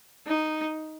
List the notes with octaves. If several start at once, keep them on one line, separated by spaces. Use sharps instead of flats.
D#4